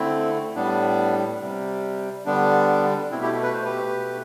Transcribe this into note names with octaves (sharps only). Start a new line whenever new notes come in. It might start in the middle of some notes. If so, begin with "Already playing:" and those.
Already playing: D3 A3 C4 E4
A2 G3 B3 D4
C3 G3
D3 G3 B3 D4
B2 A3 C4 E4
E4 G4
B4
C5
G4 B4
B2 A3